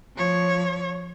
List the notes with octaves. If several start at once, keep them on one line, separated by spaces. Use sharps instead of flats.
F3 C#5